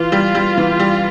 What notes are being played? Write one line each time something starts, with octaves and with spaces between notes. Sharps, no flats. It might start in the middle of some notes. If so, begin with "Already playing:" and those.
Already playing: E3 F4 F5
G3
G3
E3
G3